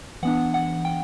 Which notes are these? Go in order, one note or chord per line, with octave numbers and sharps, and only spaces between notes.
E3 B3 D4 F#5
F#5
G5